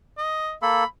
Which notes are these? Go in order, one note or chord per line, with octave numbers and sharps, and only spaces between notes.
D#5
A#3 A4 B5